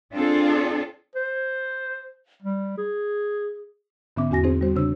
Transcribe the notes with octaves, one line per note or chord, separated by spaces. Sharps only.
C4 D4 F4 G#4 A4
C5
G3
G#4
G#2 D3 B3 C#4 E5 D6
E2 C#4 F#4 G#5 A#6
C4 D#4 G#4 C5
G3 F#4 C5
C#3 D4 C5 E6